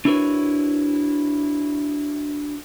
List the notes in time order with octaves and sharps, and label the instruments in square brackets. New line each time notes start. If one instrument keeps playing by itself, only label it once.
[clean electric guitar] D4 E4 F#4 A#4 B4 C#5